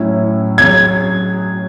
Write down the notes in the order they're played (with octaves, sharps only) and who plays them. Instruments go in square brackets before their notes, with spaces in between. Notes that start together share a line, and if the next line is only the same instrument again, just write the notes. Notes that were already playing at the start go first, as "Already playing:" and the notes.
Already playing: [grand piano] A2 F#3 C#4 E4
[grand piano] F#3 C#4 G#4 [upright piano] G#6